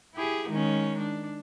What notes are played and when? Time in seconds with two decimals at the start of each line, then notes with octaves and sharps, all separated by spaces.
0.15 E4 G4 G#4
0.49 D#3 G#3 C#4
0.99 D4